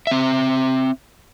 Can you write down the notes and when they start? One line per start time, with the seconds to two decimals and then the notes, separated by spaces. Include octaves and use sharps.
0.07 C4 E5